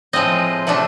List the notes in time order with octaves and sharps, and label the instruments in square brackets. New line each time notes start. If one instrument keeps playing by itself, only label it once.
[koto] A2 F3 G#3 C4 D#5
C3 F3 A3 D4